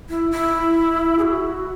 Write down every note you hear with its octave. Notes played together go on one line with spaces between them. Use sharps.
E4
E4
G#4
F#4